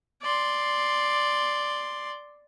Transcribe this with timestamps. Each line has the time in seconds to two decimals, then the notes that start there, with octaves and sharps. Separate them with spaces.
0.22 D5 C6